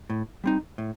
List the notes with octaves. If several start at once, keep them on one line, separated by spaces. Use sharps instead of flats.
A2
G3 C4 D#4
A2